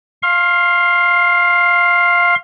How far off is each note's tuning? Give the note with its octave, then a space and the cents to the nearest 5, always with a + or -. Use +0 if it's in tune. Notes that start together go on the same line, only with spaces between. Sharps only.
F5 +0 C6 +35